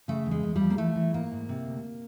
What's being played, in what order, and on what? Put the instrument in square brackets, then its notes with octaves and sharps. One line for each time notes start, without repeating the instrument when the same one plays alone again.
[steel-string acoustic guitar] C#3 A3
E2
G#3
E2
F3 G3
A#3
E3 A3
E3
G#2 A#3
G#2
C3
D2